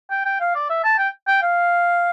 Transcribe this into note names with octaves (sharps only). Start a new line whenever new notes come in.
G5
G5
F5
D5
E5
A5
G5
G5
F5